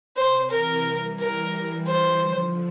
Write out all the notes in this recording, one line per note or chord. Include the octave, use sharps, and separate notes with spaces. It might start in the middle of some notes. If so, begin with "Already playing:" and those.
C3 C5
C3 E3 A#4
E3 G3
E3 G3 A#4
C5
D3 F3